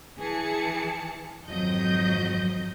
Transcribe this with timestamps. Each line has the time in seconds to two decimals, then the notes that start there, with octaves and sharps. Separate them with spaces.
0.18 E3 G#4 A5 C#7
1.47 G#1 F2 F#3 D#5 G6